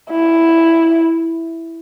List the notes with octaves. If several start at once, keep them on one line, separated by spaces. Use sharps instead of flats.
E4